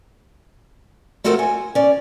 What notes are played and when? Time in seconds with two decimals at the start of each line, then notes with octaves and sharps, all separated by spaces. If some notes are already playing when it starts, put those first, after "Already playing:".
1.24 A3 C4 F4 F#4 A4 A#4
1.39 G#5
1.75 C#4 D5